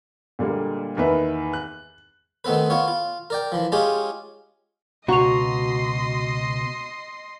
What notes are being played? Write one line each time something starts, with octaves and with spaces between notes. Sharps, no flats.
A#2 D3 G3 G#3 A#3
E2 D#3 A#3 B4 E5
F#6
D#3 A3 B3 C4 B4
B3 F4 C#5
F4
A#4 D5 G5
E3 F3
G#3 C#4 F4 G4 G#4
C#2 B2 F#4 D#5 A#5 C6 C#6 F7